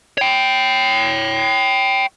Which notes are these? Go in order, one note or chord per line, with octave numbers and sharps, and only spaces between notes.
C#5 G5